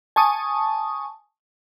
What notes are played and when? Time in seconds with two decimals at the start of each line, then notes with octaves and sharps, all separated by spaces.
0.16 G#5 A5 C#6 D#6